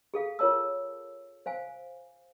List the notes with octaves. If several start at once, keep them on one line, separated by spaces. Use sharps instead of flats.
G#4 A4 F5
F4 A#4 C#5 A5 E6
C5 F5 G#5